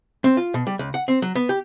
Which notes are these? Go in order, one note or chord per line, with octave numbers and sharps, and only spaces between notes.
C4
F4
B2
G3
C#2
F#5
C4
F#3
B3
G4